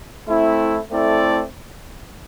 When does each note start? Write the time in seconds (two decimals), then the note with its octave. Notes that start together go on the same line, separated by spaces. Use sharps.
0.28 A3 C4 E4
0.91 A3 C4 E4 A4 D5